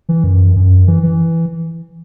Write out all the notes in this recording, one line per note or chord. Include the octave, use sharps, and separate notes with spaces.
E3
F#2
F#2
E3
E3